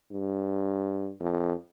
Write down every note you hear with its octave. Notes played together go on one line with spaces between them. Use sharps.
G2
F2